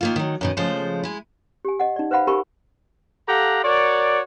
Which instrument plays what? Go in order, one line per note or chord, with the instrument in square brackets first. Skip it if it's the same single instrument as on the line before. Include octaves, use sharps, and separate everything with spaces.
[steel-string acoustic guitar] D#3 A#3 F4
D#3 F#3
F#2 B2 D#3
C#3 F3 G#3 A3 C5
G#3 E4
[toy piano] G4 G#5
D#5 F#5
D#4 D5
B4 C5 F5 F#5 B5
G4 A#4 G#5 B5 C#6
[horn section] G4 A4 F5 F#5 A#5
F#4 A#4 C#5 D5